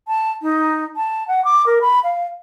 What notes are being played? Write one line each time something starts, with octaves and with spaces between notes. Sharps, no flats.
A5
D#4
A5
F#5
D6
A#4
B5
F5